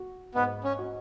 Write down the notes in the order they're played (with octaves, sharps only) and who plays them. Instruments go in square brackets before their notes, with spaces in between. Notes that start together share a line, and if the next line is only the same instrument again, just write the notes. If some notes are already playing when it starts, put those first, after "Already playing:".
Already playing: [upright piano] F#4
[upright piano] G#2 [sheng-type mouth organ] B3
[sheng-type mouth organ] C#4
[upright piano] F#4